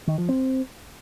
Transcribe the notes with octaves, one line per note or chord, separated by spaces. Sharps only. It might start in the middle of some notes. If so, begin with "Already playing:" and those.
D#3
F3
C4